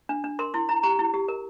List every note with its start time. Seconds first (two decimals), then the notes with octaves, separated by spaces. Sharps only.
0.09 D4
0.24 D4
0.39 A#4 C6
0.54 E4 C6
0.69 E4 A#5
0.83 G4 A#5
0.99 E4
1.14 G4
1.28 A#4